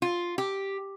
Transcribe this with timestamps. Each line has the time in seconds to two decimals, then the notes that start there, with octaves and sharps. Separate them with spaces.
0.02 F4
0.38 G4